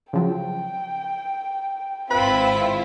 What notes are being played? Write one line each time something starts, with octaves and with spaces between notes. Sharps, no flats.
C#3 F3 F#3 G5
G#1 C4 E4 F4 B4 B5